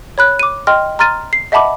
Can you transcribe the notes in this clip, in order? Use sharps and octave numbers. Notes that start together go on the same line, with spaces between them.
C#5 B5 F#6
D6 D#7
D#5 G5 C6 F6
A#5 C6 F6 A6 D#7
C7
D#5 E5 F#5 A5 B5 D6